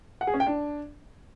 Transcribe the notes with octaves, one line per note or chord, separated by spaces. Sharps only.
F#5
G#4
C#4
G5
D4